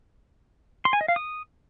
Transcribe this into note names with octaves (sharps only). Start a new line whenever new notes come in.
C6
G#5
D#5
F5
D#6